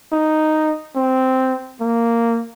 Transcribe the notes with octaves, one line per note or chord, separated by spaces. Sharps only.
D#4
C4
A#3